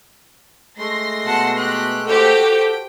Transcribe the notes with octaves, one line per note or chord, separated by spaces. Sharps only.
G#3 A3 C6 A#6
B2 F#5 A5
G4 F#6
F#4 G4 A4 C5 G5